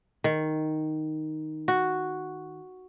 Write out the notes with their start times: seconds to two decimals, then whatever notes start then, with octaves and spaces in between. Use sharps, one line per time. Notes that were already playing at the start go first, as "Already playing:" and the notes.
0.24 D#3
1.68 F#4